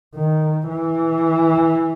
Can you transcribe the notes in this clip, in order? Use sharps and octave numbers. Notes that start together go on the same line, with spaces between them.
D#3
E3